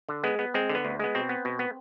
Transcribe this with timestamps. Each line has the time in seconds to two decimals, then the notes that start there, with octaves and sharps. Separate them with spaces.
0.09 D3
0.24 G#3 B3
0.39 B3
0.54 G#3 C4
0.69 D3
0.75 B3
0.85 D2
1.00 G#3 B3
1.15 B2 C4
1.29 B3
1.45 B2
1.59 B3